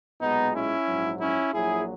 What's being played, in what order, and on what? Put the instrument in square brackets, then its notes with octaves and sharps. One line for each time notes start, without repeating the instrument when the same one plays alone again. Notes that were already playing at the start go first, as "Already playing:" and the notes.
[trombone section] B1 A#2 G#3 B3 D#4
C#4 E4
A#1 G#2 F#3
C#4 E4
A#1 A#2 F#3 E4 G#4